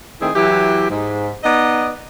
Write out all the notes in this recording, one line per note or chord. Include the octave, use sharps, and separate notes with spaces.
D#3 A3 C4 D#4 E4 G#4
E3 F#3 E4 G4
G#2
B3 D#4 D5 D#5